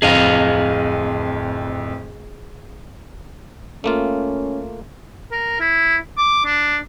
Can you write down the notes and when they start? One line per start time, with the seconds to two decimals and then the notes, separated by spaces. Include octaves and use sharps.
0.02 D1 F2 G#4 D#5 F5 A#6
3.84 A3 A#3 C#4 F4
5.32 A#4
5.60 E4
6.17 D6
6.45 D4